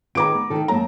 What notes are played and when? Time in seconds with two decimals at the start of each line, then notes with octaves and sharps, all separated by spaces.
0.15 D#3 G#4 B4 A#5 D6 D7
0.35 B3
0.50 D#3 A4
0.68 F#2 A#3 A5 A#5